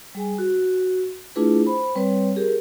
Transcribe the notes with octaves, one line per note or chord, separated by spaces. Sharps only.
G3 G#4 G#5
F#4
A3 D4 E4 F4 G#4 B4
C5 B5
G3 C4 B4 C#5
G4 G#4 A#4